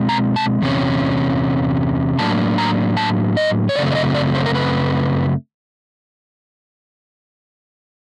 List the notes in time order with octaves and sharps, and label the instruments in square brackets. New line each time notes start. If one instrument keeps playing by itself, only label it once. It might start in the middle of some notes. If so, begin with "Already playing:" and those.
Already playing: [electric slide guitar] B2 G#3 C4
A#5
A5
E2 C3 C#4
A2 F#3 A#3 D4 A5
A#5
A5
D#5
C#5
F#2 C#3 A3 C4 D5
D5
D#5
D5
C5
A#4
B4